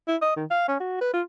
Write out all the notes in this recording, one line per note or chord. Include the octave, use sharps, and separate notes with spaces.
E4
D#5
D#3
F5
C#4
F#4
B4
F4